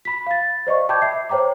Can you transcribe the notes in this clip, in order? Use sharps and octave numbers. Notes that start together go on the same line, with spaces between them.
B5 B6
F5 A6
C5 D5 D#5 C#6
G5 A5 B5 D6 G6 G#6
E5 C7
C5 C#5 G5 A#5 D6